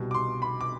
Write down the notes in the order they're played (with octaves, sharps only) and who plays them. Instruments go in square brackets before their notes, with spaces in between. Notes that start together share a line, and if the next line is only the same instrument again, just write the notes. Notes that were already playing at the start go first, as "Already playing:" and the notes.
Already playing: [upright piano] C2 B2 G3
D6
C6
B5
D6